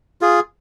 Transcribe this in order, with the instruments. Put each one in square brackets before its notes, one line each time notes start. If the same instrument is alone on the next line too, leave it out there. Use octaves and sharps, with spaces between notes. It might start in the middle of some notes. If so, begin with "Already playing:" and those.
[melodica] F4 G#4